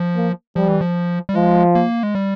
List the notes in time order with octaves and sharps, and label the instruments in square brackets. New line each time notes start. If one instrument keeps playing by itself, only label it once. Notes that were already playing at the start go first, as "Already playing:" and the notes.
Already playing: [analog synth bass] F3
[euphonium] A#3
[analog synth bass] F3 [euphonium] G3
[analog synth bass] E3
F3
G3
[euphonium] F3 [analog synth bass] G#3
[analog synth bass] A#3
G#3
G3